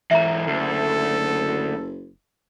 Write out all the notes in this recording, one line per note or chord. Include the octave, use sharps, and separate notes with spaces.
G#2 E3 E5 A#5
F#1 D2 A4